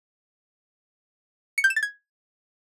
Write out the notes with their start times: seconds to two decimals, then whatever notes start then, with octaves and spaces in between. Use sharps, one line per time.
1.58 C#7
1.64 G6
1.70 E7
1.76 A6
1.83 G#6